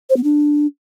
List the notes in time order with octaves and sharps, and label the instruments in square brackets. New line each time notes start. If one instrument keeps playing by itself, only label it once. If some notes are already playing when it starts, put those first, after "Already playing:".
[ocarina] C5
B3
D4